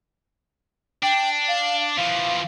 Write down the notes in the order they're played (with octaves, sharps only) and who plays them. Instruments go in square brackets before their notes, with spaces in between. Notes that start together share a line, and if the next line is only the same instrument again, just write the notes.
[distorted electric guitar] D4 [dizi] G5
[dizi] F5
[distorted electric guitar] E3 F3 [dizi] F5